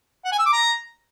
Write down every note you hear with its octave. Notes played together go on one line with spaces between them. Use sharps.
F#5
G#5
E6
D6
A#5